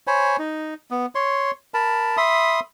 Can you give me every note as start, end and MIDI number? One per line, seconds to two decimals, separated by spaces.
0.07 0.36 72
0.07 0.36 73
0.07 0.36 80
0.07 0.36 83
0.39 0.74 63
0.91 1.06 59
1.15 1.51 73
1.15 1.51 84
1.74 2.17 70
1.74 2.17 81
1.74 2.17 83
2.17 2.60 76
2.17 2.60 83
2.17 2.60 84
2.17 2.60 87